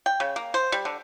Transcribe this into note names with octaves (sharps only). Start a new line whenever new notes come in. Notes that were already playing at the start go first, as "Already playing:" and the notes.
G5
C#3
A#3
C5
G3
D3